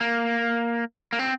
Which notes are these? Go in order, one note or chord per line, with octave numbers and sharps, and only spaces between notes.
A#3
A#3
C4